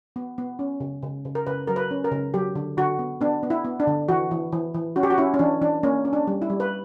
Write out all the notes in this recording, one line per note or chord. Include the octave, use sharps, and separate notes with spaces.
B3
B3
C#4
C#3
C#3
C#3
A#4
C#3 B4
F#3 A#4
B4
C#4
A#4
C#3
F#3 G4
D3
D3 F#4
B3
B3 D4
B3
E4
B3
D4
D3
E3 F#4
E3
E3
E3
C#4 F#4
G4
F#4
C#4 E4
C#4
E3 D4
E3 D4
A#3 C#4
C#4
D4
G3
E4
G3
B4